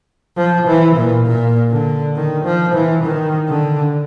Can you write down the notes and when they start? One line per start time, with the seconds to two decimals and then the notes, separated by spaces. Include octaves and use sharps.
0.37 F3
0.67 E3
0.96 A#2
1.26 A#2
1.71 D3
2.15 D#3
2.45 F3
2.75 E3
3.04 D#3
3.49 D3